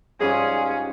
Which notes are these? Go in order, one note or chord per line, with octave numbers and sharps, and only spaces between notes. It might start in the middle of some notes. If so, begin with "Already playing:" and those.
G#2 G3 C#4 F4 G#4